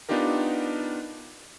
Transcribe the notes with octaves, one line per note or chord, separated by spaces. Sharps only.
B3 D4 D#4 F4 G4 A#4